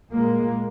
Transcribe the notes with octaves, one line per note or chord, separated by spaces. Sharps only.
A#2 G#3 A#3